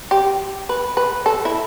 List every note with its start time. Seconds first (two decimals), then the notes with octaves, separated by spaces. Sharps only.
0.11 G4
0.69 B4
0.97 B4
1.26 A4
1.45 E4